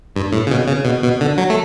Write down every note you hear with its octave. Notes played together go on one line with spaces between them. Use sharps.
G2
A2
C#3
B2
C#3
B2
B2
D3
F#3
A3